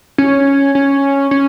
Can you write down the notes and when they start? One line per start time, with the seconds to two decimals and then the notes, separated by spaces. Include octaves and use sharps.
0.18 C#4
0.75 C#4
1.31 C#4